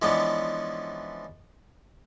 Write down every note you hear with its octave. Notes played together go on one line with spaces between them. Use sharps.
E3 F3 G#3 B3 C#4 D4